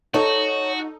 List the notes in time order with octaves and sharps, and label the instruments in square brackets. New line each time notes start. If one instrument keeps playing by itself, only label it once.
[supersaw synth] D#4 [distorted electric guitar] F#4 [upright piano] A4 [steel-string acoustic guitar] C#5